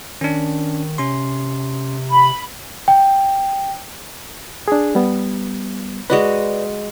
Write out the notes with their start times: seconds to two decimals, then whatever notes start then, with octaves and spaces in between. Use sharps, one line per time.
0.21 D#3 C#4 D4
0.98 C3 C#4 C6
2.12 B5
2.88 G5
4.68 D4 G#4
4.95 G3 B3
6.10 G#3 F#4 B4 D5 D#5